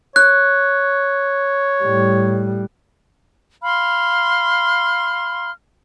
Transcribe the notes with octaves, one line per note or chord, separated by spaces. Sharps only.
C#5 F#6
A2 G3
F5 B5 C6 F6